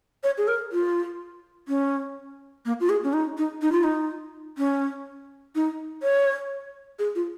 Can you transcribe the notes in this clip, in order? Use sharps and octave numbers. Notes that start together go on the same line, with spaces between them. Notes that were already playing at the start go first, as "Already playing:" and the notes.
C#5
G#4
A#4
F4
C#4
A#3
F4
G#4
C#4
D#4
D#4
D#4
F4
D#4
C#4
D#4
C#5
G#4
F4